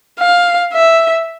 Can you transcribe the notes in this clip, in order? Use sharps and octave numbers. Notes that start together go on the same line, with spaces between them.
F5
E5